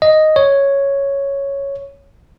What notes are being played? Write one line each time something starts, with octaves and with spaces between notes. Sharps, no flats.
D#5
C#5